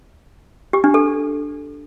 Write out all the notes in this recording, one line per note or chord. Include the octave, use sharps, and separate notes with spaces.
G4
D4
A4